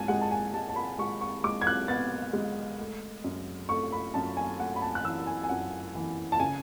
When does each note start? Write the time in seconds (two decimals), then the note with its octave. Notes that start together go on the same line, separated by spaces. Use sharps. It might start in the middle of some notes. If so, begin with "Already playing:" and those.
Already playing: G#2 G#5 A5
0.08 G#3 F#5
0.21 A5
0.31 G#5
0.54 G#3 A5
0.69 A5
0.76 B5
0.98 G#3 C#6
1.21 C#6
1.44 G#3 D6
1.61 G#6
1.67 F#6
1.88 B3 A6
2.33 G#3
2.79 A3
3.24 F#2
3.69 A3 C#6
3.92 B5
4.14 F#2 A5
4.37 G#5
4.60 A3 F#5
4.76 B5
4.82 A5
4.95 F#6
5.04 E3 E6
5.27 G#5
5.43 G#5
5.49 F#2 F#5
5.95 E3
6.32 A5
6.40 C#3 G#5